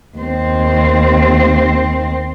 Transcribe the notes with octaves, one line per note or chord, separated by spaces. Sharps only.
D#2 C4